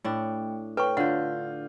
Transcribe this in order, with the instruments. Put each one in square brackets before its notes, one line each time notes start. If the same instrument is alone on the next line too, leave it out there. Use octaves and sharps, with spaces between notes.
[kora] A2 D4 [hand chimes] A3 G5
[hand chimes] A4 C#5 [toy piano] B4 C#6 [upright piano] G5
[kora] D3 [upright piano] D4 F4 [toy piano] F#5 [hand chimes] F6 G6